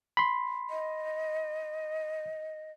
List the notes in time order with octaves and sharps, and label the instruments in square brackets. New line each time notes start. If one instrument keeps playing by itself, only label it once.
[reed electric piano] B5 C6
[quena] D#5